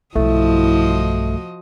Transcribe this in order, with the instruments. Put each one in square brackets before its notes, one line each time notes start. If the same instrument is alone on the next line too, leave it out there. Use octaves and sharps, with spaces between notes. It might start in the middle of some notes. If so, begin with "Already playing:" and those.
[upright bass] B1 G2 [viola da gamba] F3 F#4 D#5 [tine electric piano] A3 [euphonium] E4